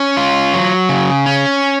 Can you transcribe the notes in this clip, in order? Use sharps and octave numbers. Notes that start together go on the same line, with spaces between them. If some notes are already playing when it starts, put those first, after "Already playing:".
Already playing: C#4
F4
F#3
C#3
C#4